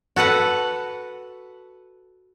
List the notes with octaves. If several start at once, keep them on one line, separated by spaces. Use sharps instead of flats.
F#4 A4 B4 F#5